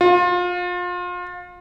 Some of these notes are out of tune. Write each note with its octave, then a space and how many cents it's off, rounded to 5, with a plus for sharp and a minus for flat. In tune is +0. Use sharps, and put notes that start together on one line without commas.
F4 +30